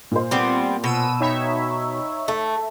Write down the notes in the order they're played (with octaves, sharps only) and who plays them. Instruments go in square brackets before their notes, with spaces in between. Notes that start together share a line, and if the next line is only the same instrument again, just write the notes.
[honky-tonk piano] A#2 C5
[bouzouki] G3 B3 C4
[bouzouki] B2 [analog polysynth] E6 D#7
[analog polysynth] D#4 C#5 E5 [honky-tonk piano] G5 B5
[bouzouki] A3 [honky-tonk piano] E5